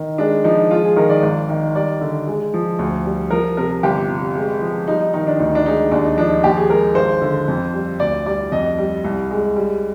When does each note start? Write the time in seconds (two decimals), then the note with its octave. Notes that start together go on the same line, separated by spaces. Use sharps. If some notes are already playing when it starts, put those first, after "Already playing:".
Already playing: D#3
0.18 G#3 D4
0.44 F3 D#4
0.71 G#3 F4
0.83 G#4
0.96 D#3 A#4
1.10 D5
1.22 G#1
1.49 D#3
1.75 G3 D5
2.01 D3
2.27 G#3
2.54 F3
2.79 D2
3.05 G3
3.31 F3 A#4
3.57 C3 A#4
3.83 G1 G4
4.10 C3
4.35 G#3
4.61 F3
4.87 G3 D#4
5.00 D#4
5.13 D#3 D#4
5.27 D4
5.39 D2 D#4
5.55 D4
5.66 G#3 D#4
5.91 D#2 D4
6.05 D#4
6.17 F3 D4
6.30 D#4
6.44 D#2 G4
6.57 G#4
6.70 G#3 A#4
6.95 G#1 C5
7.21 D3
7.48 F2
7.74 G3
8.00 D2 D5
8.26 G3 D5
8.52 F2 D#5
8.78 G3
9.04 C2
9.31 G#3
9.56 G3